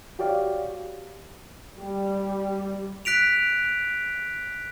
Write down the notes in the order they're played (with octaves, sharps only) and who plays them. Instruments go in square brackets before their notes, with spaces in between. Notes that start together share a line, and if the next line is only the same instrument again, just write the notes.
[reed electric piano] F#4 G4 C#5 D5 F5
[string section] G3
[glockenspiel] F#6 B6 D7 F7